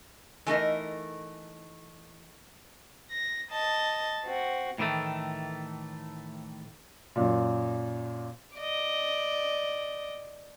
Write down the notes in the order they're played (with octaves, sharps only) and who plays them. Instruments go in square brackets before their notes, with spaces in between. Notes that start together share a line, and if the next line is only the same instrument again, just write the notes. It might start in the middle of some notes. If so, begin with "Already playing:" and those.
[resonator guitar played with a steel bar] E3 A3 D#4 A#4
[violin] A#6
D#5 A5
C4 F#4
[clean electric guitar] A2 D#3 E3 A3
[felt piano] F#2 A#2
[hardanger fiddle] D5 D#5